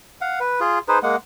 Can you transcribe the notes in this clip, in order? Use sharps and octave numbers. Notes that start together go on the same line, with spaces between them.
F5 F#5
B4
F4 G#4
D#4 G#4 B4 C5
G#3 A#3 F#5